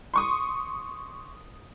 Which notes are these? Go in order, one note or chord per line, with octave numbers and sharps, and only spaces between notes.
C6 C#6 D#6